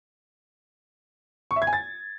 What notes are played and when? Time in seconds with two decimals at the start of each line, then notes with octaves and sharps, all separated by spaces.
1.51 C#6
1.56 E5
1.62 G#6
1.67 G#5
1.73 A6